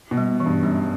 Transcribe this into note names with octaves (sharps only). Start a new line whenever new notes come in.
B2
G3
E3
G2
F#2 G3